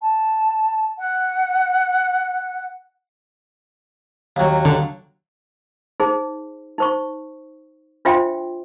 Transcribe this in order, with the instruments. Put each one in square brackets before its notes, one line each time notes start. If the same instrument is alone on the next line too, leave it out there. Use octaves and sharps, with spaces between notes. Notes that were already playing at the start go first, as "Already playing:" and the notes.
[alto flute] A5
F#5
[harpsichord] D#2 F#3
[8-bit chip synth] D3
[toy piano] D#4 G#4 C5
D#4 C5 C#6
D4 F4 C5 E5 G5 C6